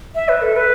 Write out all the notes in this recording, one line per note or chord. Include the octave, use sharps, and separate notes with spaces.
E5
B4
A4
B4